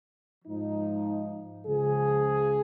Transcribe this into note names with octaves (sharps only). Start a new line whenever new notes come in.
G#2 F3 D#4
C#2 C#3 F3 G#4